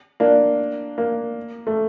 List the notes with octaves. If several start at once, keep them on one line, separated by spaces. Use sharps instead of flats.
A#3 D4
A#3
A3